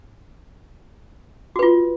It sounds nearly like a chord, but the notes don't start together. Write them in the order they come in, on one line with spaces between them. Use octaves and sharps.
F#4 B4 F4